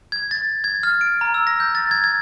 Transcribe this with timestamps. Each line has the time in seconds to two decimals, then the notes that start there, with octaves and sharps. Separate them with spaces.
0.12 G#6
0.31 A6
0.64 G#6
0.83 F6
1.01 D7
1.21 A#5
1.34 E6
1.47 A#6
1.60 G6
1.75 A6
1.91 G#6
2.04 G#6